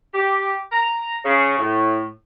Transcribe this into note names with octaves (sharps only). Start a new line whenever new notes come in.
G4
A#5
C#3
A2